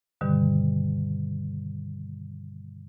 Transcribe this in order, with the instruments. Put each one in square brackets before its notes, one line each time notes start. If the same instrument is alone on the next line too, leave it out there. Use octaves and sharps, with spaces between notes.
[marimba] G2 B2 D3 D#3 G3